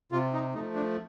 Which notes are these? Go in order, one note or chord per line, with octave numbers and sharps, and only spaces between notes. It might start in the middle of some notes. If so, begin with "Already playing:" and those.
C3 F4
D#4
F3 A3 D#4
D4